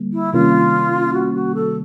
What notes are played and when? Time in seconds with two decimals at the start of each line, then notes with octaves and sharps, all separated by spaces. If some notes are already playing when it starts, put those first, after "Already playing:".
Already playing: D3 G3 A#3
0.12 E4
0.32 C3 D#3 G3 A#3 C#4 F4
1.13 F#4
1.34 F#4
1.54 A4